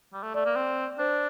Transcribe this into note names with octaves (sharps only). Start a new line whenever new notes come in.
G3
A3
A3 D5
A#3
C4
D4 C5